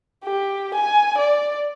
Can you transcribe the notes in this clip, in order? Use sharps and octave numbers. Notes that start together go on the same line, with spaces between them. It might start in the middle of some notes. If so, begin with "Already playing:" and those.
G4
G#5
D5